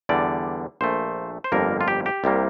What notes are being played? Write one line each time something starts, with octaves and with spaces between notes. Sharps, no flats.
E2 D3 G3 D5
A#1 A#2 A3 C5
C5
G1 F2 D3 G3 A#3 A#4
F4
G4
G4
C2 C3 G3 A#3